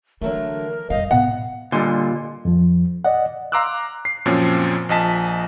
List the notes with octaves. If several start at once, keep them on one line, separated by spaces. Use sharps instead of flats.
D3 E3 F#3 A3 A#4
F2 G3 D#5 F5
A2 C3 B3 F#5
A#2 D3 G3 D4 D#5 G#5 C6
F2 F3
D5 D#5 F#5
F5 A#5 C6 D6 E6 F#6
C7
F#2 A#2 F3 C4 C#4
A#1 F3 D#5 G#5 A5 B6